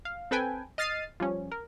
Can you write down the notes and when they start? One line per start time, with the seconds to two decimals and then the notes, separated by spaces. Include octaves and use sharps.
0.05 F5
0.31 C4 A4 B4 G5 G#5
0.78 D#5 F6 A6 C7 D#7
1.20 F3 G3 C#4
1.52 A#4